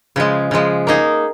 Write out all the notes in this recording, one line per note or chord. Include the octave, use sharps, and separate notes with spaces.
C#3 F3 G#3
C#3 F3 G#3
A#3 D#4 G#4